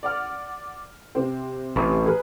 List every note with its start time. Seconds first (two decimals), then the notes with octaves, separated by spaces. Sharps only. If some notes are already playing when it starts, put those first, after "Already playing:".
0.03 D5 F#5 F6
1.15 C3 C4
1.76 A1
2.06 G#4 A#4 B4